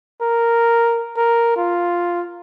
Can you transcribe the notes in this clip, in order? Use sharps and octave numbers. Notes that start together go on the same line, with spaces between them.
A#4
A#4
F4